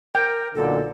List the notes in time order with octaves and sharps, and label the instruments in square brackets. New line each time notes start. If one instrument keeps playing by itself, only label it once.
[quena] A#4 [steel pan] G5
[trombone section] B1 A#2 D3 [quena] A4